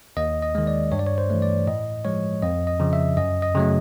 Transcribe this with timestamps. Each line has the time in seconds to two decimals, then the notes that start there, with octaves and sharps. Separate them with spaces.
0.17 D#2 D#5
0.43 D#5
0.55 D#3 G#3
0.67 D5
0.92 G2 C#5
0.99 D5
1.07 C#5
1.18 C5
1.30 E3 A3
1.42 D5
1.67 A2 D#5
2.05 F3 G#3 C#5
2.42 F2 D#5
2.67 D#5
2.80 C#3 F3
2.93 E5
3.17 F#2 D#5
3.42 D#5
3.55 C#3 F#3 A3